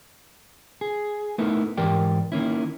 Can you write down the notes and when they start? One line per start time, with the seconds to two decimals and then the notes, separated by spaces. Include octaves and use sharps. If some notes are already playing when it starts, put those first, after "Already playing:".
0.81 G#4
1.38 A3 B3 D#4 E4 A4 A#4
1.77 G#2 E3 G4 A#4 D5 G5
2.32 D#3 A#3 C#4 E4